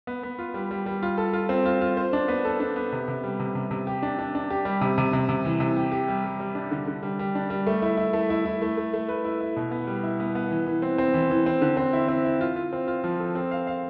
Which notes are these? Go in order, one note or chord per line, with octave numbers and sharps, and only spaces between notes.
B3
B3
F4
G3
G3
G3
F4
A4
F4
C4
F4
F4
C5
D4
B3
A4
D4
B3
C3
C3
G3
C3
C3
C3
G4
D4
D4
D4
G4
G3
C3
C3
C3
C3
E3
C3
G4
G4
G3
G3
G3
D4
D3
D3
G3
G3
D4
G3
A3
E4
E4
A3
E4
E4
A3
A3
A3
B4
E4
E4
B2
B3
G3
E4
B3
B3
E3
E3
C4
C4
E3
E3
C4
D3
C4
E4
C4
E4
F4
F4
C4
F4
F3
A4
C4
F5
F5